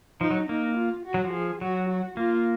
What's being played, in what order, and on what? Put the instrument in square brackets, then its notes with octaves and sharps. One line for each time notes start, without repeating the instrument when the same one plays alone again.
[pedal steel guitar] F3 [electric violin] D#4
[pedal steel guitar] F#3
[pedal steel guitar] A#3 [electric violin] D#4
[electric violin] F4
F#4
[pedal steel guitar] F#3
F3
[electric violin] G#4
[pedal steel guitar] F#3 [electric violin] F#4
[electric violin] F#4
[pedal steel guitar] A#3 [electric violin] F4